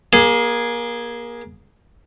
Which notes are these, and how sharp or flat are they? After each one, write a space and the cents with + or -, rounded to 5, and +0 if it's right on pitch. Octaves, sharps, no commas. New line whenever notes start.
A#3 +25 G#4 +0